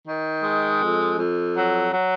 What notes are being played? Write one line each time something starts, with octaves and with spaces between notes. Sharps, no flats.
D#3
G#3
F2
F2
F#3
F#3